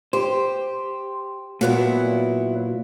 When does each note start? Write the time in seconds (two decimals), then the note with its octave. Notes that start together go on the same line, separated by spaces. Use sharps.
0.13 G4 C5
1.61 A#2 F#3 B3 E4